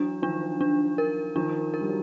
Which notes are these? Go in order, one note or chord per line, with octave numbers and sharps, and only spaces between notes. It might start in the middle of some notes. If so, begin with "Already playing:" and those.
Already playing: E3 F#3 D4
D#3 F3 D4
D4
A#4
D#3 F3 D4
A#4
G3
F#3